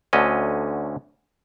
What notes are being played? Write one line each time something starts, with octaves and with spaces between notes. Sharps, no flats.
D2 D3 C#4 D#5